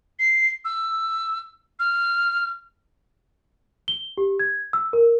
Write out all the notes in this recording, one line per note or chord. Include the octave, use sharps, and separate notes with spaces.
C7
E6
F6
G7
G4
G#6
E6
A#4